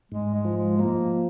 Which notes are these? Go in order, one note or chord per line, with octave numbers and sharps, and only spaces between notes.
G#2 G#3
G#3
F3
G#3
F3 A#3